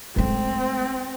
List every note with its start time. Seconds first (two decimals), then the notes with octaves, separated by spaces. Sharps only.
0.16 G#3 A3 C4